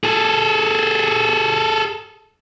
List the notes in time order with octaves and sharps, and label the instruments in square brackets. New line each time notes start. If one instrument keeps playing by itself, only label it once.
[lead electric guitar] G#4 A4